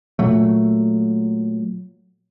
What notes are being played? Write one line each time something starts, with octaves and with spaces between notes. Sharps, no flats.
A#2 F#3 A3